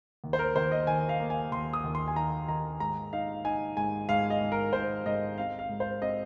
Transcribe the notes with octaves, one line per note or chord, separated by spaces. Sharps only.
D#2
C5
A#4
D#2 C5
D#5
D#3 G#5
F5
A#3
G#5
D#2 C6
D#6
D#2
C6
G#5
D#3 A#5
D#3 A#5
G#2 A#5
D#4 F5
D#4 G#5
G#2 G#5
G#2 F5
D#5
G#2
A#4
G#2 C5
G#2 D#5
C4 F5
F5
G#2
C5
C4 D#5